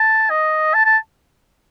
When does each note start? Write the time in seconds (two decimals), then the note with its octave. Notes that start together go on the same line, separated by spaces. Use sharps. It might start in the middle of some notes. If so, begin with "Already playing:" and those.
Already playing: A5
0.30 D#5
0.74 A5
0.85 A5